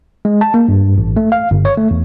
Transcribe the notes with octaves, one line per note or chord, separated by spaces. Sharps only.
G#3
A5
A#3
G2
A1
A3
F5
G1
C#5
A3
E2